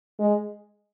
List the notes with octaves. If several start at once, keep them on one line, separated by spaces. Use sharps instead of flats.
G#3